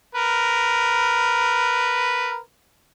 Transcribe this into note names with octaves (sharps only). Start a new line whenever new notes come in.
A#4 B4